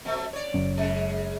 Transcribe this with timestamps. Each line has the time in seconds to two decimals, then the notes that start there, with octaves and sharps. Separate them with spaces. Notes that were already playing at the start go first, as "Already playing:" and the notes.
0.05 B2 F#3 A3
0.33 C#5 D5
0.54 F#1 F#3 C#4
0.78 C#3 G#3